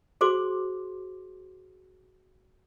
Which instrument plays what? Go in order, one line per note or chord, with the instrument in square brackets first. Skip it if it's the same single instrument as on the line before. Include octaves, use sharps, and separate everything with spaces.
[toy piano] F#4 G#4 C5 C6 D6